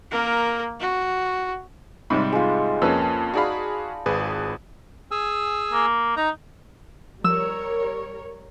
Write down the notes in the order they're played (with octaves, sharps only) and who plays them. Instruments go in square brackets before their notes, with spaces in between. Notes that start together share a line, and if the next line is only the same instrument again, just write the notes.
[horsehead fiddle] A#3 A#4
F#4
[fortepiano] G#2 C3 G3 [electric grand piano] B5
[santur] G#3 F4
[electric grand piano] F2 A#3 [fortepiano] C#4 B4 E6 [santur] A5
[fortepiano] D#4 D5 B5 [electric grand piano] F#4 G#4 F5
[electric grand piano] G#1 G#4 B4
[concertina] G#4 G#5 E6
[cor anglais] A#3
[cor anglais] D#4 [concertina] A#5
[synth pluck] F3 [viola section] G3 A#4 C#5 [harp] E6